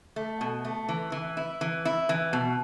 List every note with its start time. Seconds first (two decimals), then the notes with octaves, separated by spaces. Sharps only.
0.16 A3
0.41 B2
0.65 A3
0.89 E3
1.12 E3
1.37 E4
1.61 E3
1.85 E4
2.09 E3
2.33 B2